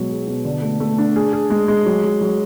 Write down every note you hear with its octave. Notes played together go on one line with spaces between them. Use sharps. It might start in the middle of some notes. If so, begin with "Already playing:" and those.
Already playing: B2 F#3 G#3
G#4
B2
D3
A3
A3
D4
G#4
G#4
G#3
G#3
F#3
F#3
F#3